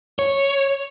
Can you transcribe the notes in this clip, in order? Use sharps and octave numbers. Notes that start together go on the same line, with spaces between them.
C#5